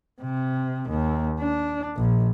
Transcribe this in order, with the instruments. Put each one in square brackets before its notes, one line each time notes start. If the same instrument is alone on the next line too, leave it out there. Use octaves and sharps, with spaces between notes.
[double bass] C3
D#2
D4
A#1